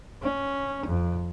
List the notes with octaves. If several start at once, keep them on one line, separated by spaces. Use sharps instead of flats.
C#4
F2